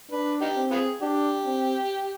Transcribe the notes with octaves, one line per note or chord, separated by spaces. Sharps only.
D4 B4
D#4 G4
C4
B3 F4 G#4
D4 G4
C4